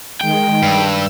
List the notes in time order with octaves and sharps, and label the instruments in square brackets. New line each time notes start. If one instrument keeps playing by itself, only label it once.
[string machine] D#3 G#3 [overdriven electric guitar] G5
[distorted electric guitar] G2 [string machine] E6